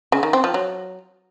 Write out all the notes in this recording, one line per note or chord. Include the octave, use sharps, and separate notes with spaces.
C#3
D#3
C4
F3
F#3